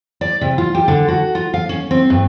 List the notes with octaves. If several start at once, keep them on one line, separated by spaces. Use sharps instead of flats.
D5
C3
F4
G4
D3
F#4
F4
F5
C#4
C4
G2